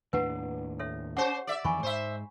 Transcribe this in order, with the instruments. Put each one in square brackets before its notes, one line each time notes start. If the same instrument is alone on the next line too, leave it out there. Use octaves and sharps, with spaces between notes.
[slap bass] D#2 A2 D4 [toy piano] B4 F#5
[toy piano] A4 C#5 E5
[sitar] C#4 C5 [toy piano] G4 C#5 F#5
[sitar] D5 E5
[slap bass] F2 D#3 E3 [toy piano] G#5 B5 C#6
[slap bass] G#2 [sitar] C5 E5